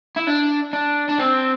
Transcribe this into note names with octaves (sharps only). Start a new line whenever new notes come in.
E4
D4
D4
D4
C4